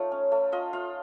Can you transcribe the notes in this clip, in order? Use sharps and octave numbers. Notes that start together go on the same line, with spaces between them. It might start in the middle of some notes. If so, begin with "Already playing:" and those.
Already playing: A3 D#4 F4 A4 C#5 F5
C#4
A3
F4 D#5
F4 F5